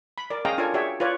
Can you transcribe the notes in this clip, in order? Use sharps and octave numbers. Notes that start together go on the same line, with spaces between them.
B5
A#4 D5
C#4 G#4 D#5 F5 G5 A#5
D4 F4 A4 A#4 C#5 G#5
F#4 G#4 C#5 D5 E5 G5
F4 B4 C#5 D5